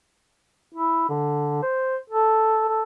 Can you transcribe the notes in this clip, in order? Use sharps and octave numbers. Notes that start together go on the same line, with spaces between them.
E4
D3
C5
A4
A4